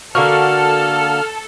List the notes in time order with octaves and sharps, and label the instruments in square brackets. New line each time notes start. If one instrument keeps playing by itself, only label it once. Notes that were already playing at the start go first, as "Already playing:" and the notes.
[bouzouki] D3 A#3 F#4 [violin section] A4 [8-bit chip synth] F6